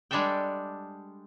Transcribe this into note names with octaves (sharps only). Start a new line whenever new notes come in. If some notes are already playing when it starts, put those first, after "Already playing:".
G3 G#3 D4 A4 E5 G5